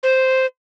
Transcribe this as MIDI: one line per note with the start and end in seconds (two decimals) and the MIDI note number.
0.03 0.46 72